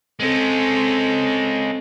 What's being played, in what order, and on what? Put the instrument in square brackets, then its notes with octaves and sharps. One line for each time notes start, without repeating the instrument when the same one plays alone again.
[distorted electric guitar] G#3 C#4 [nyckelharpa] C4 A4